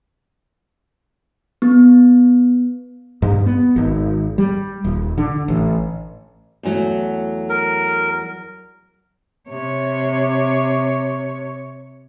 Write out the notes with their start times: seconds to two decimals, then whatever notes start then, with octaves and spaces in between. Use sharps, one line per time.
1.62 B3
3.22 G2
3.46 B3
3.76 G#1
4.38 G3
4.84 D#1
5.18 D3
5.48 A1
6.63 E2 F#3 A3
7.49 A#4
9.48 C3 C#5